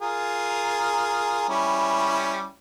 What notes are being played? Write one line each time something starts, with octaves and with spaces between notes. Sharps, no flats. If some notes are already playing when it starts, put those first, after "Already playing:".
F4 G#4 A#4
G3 C#4 E4